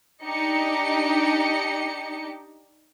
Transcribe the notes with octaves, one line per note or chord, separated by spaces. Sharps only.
D4 D#4 G4 D#5 A5 C#7